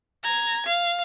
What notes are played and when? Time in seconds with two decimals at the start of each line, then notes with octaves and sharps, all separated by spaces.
0.23 A#5 G#6
0.66 F5